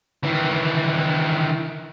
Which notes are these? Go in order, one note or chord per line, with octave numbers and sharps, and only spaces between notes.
D#3 E3